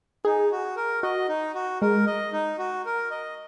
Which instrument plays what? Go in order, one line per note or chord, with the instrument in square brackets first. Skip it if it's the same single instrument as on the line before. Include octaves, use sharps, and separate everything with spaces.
[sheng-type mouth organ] D#4 [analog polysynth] G#4
[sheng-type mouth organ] F#4
A#4
[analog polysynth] F#4 [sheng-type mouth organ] D#5
[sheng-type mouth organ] D#4
F#4
[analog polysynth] G#3 [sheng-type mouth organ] A#4
[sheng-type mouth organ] D#5
D#4
F#4
A#4
D#5